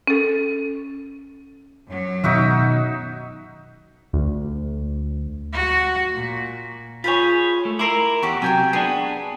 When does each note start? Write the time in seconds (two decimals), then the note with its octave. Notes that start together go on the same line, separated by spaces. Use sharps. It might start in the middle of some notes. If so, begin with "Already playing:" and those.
0.07 C#4 A4
1.88 F#2 F#3
2.24 B2 D#3 D#4 F#4 E5
4.13 D2
5.53 F#4
6.12 A#2
7.04 F4 G#4 C5 C#5 B5
7.65 A3
7.79 E4 A#4 A#5 C6 D6
8.23 E2 F#4 G4 C#5
8.42 C3 F#3 G4 G5 G#5
8.73 B3 D4 G#4